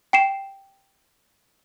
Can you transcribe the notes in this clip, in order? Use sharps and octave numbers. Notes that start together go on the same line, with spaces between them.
G5 C7 E7